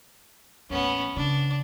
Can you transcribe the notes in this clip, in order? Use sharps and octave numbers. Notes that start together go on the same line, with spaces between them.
A1 D#2 B3 C#4
C#3 D4